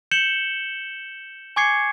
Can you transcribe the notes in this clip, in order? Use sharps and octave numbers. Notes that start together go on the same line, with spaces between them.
G6 C#7 E7 F#7 G7
G#5 C#6 D6 G#6 C7 C#7